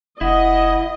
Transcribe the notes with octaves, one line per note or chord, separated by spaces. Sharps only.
F1 E4 D#5 F#5